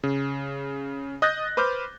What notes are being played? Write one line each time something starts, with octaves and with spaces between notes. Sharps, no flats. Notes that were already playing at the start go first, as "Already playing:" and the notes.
C#3
D#5 D#6 F#6 G6 A6 A#6
B4 C5 D6 F6 G6